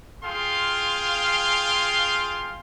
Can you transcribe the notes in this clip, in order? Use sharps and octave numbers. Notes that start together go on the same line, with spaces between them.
F4 G#4 F5 G5 C6